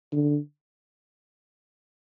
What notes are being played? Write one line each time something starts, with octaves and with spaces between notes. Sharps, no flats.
D3